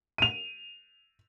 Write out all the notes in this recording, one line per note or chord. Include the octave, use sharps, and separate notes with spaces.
D#7 F7